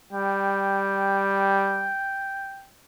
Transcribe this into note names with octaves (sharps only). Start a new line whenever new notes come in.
G3 G5